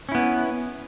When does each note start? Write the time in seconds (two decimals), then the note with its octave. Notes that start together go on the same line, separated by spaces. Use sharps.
0.09 C#4
0.12 E4
0.15 B3